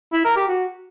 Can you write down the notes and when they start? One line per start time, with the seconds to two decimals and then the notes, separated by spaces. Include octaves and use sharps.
0.13 E4
0.25 A#4
0.36 G4
0.48 F#4